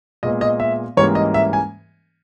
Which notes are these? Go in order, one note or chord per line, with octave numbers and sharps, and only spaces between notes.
A#2 G#3 B3 D#5
D#5
E5
G#2 E3 G3 A#3 C#4 C#5
D#5
E5
G#5